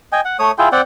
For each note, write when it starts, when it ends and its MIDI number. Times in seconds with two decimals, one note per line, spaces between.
0.12 0.21 75
0.12 0.21 79
0.12 0.21 80
0.25 0.37 78
0.39 0.51 57
0.39 0.51 73
0.39 0.51 87
0.58 0.69 64
0.58 0.69 65
0.58 0.69 68
0.58 0.69 79
0.72 0.81 60
0.72 0.81 74
0.72 0.81 78
0.72 0.81 79